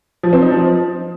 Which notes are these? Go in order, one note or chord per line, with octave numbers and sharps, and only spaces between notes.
F3
C4
D#4
F3